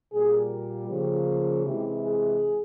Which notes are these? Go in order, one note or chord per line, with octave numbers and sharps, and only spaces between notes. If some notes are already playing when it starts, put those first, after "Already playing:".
A#2 G3 A#3 G#4
C#3 F3 A#3 G4
C3 E3 G#3 G4
G#4